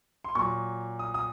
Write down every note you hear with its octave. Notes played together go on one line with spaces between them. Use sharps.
C6
A#2 F#3 C#6
D#6
D#6